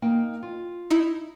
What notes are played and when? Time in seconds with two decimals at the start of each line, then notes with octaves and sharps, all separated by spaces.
0.02 A#3 D#4 G5
0.43 F4
0.90 D#4 E4